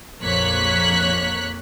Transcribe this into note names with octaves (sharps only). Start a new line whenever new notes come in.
A#1 F2 A#3 C#5 F#6 B6